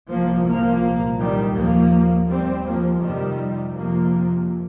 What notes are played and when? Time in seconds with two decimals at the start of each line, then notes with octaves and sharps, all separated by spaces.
0.10 C2 C3 F3 A#3
0.47 F3 A#3
0.83 C2 A#2
1.20 D#3 G3
1.56 D#2 F3 A#3
2.29 D#2 G3 C4
2.66 F3 A#3
3.02 F2 C3 D#3 G3
3.75 F2 C3 F3 A#3